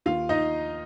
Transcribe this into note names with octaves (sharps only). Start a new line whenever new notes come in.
D#2 F4 F5
D#4 D#5